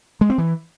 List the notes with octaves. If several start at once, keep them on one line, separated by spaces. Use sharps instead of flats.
G#3
C4
E3